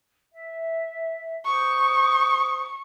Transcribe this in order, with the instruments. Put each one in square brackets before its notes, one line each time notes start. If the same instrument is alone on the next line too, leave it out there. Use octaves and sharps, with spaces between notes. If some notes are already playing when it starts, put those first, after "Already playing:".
[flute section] E5
[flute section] C5 D#6 [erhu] C#6